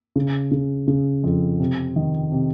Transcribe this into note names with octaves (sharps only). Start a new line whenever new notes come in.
C#3
C#3
C#3
F2
C3
D#3
C3